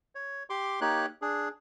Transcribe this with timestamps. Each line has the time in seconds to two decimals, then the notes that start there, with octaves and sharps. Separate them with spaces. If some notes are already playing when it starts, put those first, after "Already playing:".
0.15 C#5
0.50 G4 C6 D6
0.81 A#3 D#4 G4 C#5 F#6
1.22 D4 G#4